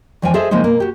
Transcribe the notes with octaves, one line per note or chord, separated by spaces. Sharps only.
E2 E3 F3 G#3 G5 G#5
G#4 A4 C5 D#5 E5
C#3 F3 G#3 A#3 C4 D#4
B2 A#3
F#4 G4